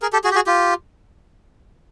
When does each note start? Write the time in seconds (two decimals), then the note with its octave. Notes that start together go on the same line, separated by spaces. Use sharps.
0.02 G#4 A#4
0.13 G4 A4
0.24 F#4 G#4
0.31 G4
0.35 F#4 G#4
0.46 F4 G4